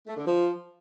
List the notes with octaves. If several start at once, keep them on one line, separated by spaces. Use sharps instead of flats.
A3
D3
F3